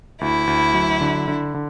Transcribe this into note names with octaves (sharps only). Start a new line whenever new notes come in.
D2 E4
D2
F#3
D3
D3
D3